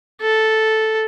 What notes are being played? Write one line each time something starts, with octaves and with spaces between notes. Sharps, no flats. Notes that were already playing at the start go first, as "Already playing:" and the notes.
A4